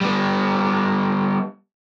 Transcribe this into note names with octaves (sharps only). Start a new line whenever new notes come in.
G3 B3